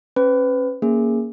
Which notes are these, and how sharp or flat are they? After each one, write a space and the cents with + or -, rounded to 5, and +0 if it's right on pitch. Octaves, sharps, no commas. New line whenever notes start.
C#4 -30 B4 +25
A#3 +0 C#4 +5 G#4 +0